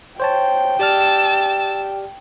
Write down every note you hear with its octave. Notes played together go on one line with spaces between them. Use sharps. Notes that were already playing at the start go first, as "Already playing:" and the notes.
C5 C#5 G5 A5
G4 D5 A5 E6 F6